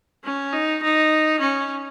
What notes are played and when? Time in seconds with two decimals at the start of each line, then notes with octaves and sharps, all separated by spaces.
0.24 C#4
0.53 D#4
0.83 D#4
1.40 C#4